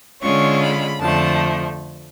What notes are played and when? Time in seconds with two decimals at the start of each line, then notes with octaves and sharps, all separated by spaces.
0.22 D3 G#3 C#4 F4 C#6
0.62 B5
1.01 F2 D3 F3 A3 A5